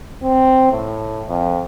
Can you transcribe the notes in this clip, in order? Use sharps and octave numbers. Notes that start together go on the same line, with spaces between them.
C4
A2
F2